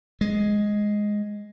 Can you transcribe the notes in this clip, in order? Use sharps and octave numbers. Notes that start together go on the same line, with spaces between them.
G#3